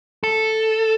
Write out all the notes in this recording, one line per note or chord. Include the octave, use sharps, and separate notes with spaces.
A4